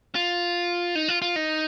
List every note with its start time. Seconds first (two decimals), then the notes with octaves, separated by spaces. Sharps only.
0.15 F4
0.95 D#4
1.08 F4
1.22 F4
1.36 D#4